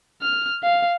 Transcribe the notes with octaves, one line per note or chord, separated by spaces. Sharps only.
F6
F5